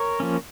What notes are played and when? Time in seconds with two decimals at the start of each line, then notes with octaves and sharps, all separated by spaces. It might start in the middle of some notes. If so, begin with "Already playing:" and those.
Already playing: A#4 C#5
0.20 F3 A#3 C#4